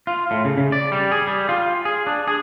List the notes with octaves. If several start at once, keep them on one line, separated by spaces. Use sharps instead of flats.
F4
A2
C#3
C#3
D5
G3
G#4
G3
F4
G#4
D4
G#4